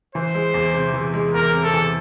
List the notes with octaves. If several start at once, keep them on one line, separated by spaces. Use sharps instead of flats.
E3 C5
G#3
E2
C3
E3
G#3
E2 A#4
C3
A4
E3